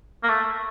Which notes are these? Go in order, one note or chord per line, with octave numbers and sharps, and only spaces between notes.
A#3
A3